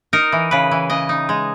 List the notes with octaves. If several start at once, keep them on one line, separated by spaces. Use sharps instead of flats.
D#4 A#4
E3
C#3 B4
E3
C#3 D#5
D#4
G#3